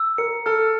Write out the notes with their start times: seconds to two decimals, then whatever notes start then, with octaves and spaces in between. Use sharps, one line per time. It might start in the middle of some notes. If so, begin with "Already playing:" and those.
Already playing: E6
0.18 A#4 C#7
0.46 A4 F6